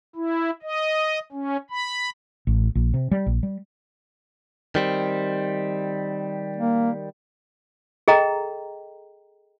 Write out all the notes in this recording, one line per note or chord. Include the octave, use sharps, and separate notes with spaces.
E4
D#5
C#4
B5
A1
A#1
C3
G3
A#1
G3
D#3 G3 C4
A#3
G#4 A4 D#5 G5 A#5